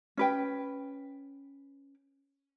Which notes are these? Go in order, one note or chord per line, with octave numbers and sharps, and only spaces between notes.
C#4 B4 G5